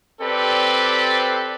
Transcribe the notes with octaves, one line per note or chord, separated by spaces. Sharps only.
C4 G4 A4 B4 D5